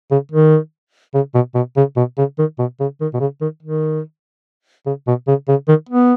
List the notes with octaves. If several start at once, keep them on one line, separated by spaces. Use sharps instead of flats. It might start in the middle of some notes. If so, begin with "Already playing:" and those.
C#3
D#3
C#3
B2
B2
C#3
B2
C#3
D#3
B2
C#3
D#3
B2
C#3
D#3
D#3
C#3
B2
C#3
C#3
D#3
B3